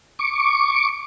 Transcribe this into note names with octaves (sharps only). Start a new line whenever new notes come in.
C#6 D6